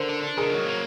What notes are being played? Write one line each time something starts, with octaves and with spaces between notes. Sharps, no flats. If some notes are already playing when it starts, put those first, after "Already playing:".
Already playing: D3 A#4 C5
D4
D4
D#3 G#4 A#4
F#3
A#3